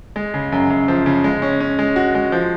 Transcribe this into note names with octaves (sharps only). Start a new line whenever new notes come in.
G#3
C#3
F#2
F#2
F3
C#3
G#3
C#4
C#4
G#3
F#4
G#3
F3